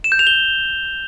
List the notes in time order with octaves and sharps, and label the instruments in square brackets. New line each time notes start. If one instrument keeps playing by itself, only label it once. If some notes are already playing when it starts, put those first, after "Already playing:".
[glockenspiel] E7
G6
F7
G7